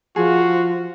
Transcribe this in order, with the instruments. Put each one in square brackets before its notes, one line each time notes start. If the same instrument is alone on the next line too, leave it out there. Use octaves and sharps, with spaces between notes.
[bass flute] F3 [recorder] F4 [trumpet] F#4 [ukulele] G#4